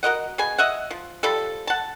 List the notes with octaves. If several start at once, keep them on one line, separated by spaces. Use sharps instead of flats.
F#4 A#4 D#5 F#5
B2 G#4 G#5
D#5 E5 F#5
F3
F3 G3 A4
F#5 A5